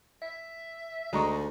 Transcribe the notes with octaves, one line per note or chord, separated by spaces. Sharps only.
E5
D2 G#3 D4 D#4 D#5 A#5 C#6